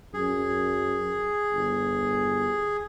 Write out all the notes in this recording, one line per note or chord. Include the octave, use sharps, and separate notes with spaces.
F#2 G#4
G1